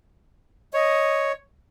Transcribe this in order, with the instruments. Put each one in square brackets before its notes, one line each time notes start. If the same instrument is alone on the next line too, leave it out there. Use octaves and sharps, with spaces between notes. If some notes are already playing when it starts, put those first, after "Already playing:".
[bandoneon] C#5 [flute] D#5